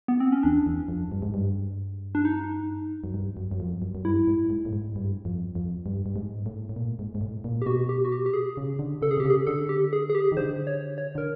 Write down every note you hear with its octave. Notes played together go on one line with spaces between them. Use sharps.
B3
C4
C#4
E2 D4
E2
F2
G2
G#2
G2
D4
D#4
F#2
G2
F#2
F#2
F2
F#2
F#2
G2 E4
G#2
G#2
A2
G#2
G2
F2
F2
G2
G2
G#2
A2
A2
A#2
G#2
G#2
A2
A#2
G4
B2 F#4
G4
F#4
G4
G4
G#4
C#3
D3
C#3 A4
G#4
C3
G4
C#3
G#4
D3 A4
G4
G#4
G#4
G4
D#3
D3 C5
C#5
C#5
D3 A#4